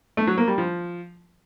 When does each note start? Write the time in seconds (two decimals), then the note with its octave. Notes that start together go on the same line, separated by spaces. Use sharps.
0.17 A3
0.27 F#3
0.38 A#3
0.48 G3
0.58 F3